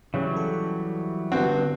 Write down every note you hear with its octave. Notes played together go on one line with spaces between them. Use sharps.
C#3 E3 F#3 G3
A4
G2 D3 B3 C4 F#4